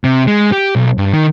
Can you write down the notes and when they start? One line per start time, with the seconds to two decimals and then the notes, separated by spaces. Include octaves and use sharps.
0.04 C3
0.27 G#3
0.52 G4
0.76 B1
0.98 G2
1.13 D#3